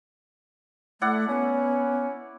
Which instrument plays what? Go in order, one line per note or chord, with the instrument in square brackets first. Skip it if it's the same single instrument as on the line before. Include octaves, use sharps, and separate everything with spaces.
[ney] A3 [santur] E4 D5 F#5
[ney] B3 [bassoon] C#4